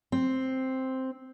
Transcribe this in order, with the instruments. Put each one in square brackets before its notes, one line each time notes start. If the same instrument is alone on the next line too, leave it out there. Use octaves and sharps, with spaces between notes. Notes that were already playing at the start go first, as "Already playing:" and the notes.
[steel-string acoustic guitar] C4